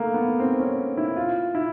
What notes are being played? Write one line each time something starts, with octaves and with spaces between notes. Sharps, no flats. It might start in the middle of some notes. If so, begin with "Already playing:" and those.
Already playing: A3 A#3
B3
C4
C#4
E4
F4
E4